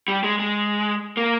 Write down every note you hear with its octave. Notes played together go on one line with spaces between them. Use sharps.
G3
G#3
G#3
A#3